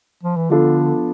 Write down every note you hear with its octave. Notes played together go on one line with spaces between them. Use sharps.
F3
E3
D3 F3 B3 D4 F4 A4